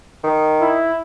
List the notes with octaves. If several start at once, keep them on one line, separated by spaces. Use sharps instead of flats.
D#3
E4